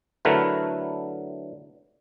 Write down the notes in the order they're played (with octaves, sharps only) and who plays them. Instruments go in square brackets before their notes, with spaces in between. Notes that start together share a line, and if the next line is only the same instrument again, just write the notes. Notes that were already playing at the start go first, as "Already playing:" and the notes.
[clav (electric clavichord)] D3 F#3 A3 E4 A#4 B4